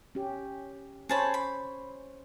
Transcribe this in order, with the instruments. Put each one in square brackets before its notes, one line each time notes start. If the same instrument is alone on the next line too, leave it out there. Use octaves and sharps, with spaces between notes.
[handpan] C#4 G4
[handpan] C#4 C5 C#5 [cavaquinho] G#4 A5 B5
[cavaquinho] B5